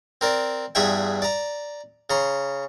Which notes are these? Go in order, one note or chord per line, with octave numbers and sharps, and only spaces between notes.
C4 A#4 D5
E2 G2 G#4 E5 G5
D5 A#5
C#3 A#5 C6